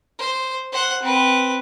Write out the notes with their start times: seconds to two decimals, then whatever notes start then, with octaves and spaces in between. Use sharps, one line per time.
0.18 C5
0.72 C5 F#5
1.03 C4 B4